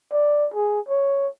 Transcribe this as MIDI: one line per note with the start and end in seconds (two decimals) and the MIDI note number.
0.12 0.48 74
0.54 0.80 68
0.89 1.28 73